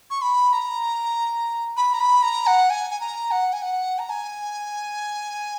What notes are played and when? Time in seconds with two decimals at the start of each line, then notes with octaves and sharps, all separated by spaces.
0.10 C#6
0.22 B5
0.53 A#5
1.77 B5
1.93 A#5
2.00 B5
2.23 A#5
2.47 F#5
2.70 G#5
2.90 G#5
3.00 A#5
3.31 F#5
3.53 G#5
3.62 F#5
3.99 A#5
4.09 G#5